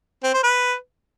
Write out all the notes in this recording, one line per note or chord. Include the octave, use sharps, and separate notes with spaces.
C4
C5
B4